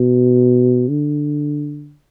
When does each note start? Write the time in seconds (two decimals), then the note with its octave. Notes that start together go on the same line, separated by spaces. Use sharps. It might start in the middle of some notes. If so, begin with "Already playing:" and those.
Already playing: B2
0.89 D3